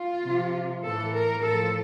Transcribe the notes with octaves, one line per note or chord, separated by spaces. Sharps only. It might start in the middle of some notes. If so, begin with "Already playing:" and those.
Already playing: F4
C3 F3
A2 E3 A4
A#4
A2 F3 A4